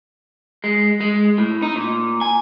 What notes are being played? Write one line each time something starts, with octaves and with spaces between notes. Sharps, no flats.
G#3
G#3
A2
D#4
A#2
G#5